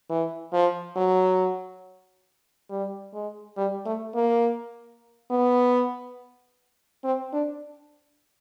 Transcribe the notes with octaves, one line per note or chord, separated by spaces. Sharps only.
E3
F3
F#3
G3
G#3
G3
A3
A#3
B3
C4
D4